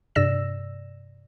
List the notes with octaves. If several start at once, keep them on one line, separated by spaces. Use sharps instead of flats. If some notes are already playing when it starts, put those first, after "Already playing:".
G2 C3 D5 E6 A#6 E7